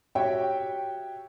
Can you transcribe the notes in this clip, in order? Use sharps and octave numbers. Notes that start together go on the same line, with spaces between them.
F#4 G4 C#5 E5 G5